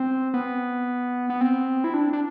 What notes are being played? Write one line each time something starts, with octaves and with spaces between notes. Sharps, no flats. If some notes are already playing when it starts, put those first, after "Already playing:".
Already playing: C4
B3
B3
C4
E4
D4
D4